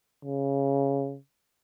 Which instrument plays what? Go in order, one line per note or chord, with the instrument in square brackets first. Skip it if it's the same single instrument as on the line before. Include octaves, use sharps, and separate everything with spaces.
[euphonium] C#3